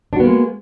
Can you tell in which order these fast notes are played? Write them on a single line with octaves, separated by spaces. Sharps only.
D4 F#4 B3 A#3 G#3